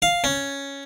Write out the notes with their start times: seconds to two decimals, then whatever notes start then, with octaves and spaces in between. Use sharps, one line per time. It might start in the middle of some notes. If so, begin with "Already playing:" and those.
0.02 F5
0.24 C#4